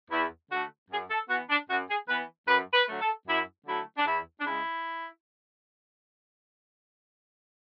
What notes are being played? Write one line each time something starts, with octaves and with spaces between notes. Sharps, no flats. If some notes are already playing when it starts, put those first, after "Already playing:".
E2 E4
D3 A3 F#4
F#2 G#4
A4
E3 B3 F#4
D4
F#2 F#4
G#4
E3 B3 B4
F#2 B4
B4
D3 F#3 A3
A4
F#2 E4
D3 F#3 A3 E4
D4
E2 E4
D4
C#3 G#3 E4